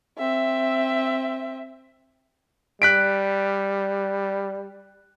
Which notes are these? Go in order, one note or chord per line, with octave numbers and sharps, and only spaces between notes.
C4 E5
G3 F#6 B6 D7